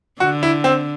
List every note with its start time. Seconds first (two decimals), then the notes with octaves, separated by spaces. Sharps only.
0.20 D3 F#4
0.43 E4
0.64 C4